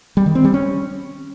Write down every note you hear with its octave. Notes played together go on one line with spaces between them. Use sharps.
G3
D#3
C4
G3
C#4